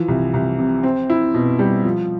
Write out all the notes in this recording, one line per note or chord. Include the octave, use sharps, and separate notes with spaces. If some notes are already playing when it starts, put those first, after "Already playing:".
Already playing: E3 F3
C2
C2
C3
C4
E4
B2
G3
F3